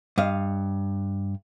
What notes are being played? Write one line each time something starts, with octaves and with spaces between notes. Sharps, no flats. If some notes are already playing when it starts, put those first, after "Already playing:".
G2 D#5 F5